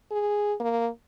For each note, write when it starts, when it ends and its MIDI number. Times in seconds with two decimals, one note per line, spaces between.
0.11 0.54 68
0.60 0.88 58